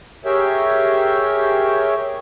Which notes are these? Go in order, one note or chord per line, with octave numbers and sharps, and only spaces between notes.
G4 G#4 A#4 C#5 E5 G5